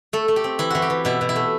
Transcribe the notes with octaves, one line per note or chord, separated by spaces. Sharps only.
A3 A4
A3
G4
C4
E3 E4
E3 F#4
G4
E3
B2 E4
B2
E4
A3